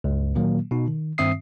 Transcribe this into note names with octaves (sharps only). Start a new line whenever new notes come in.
C#2 G2
A#2 D#3 F#3 A#3
B2 D#4
D#3
G2 D#3 C4 E5 D#6 C7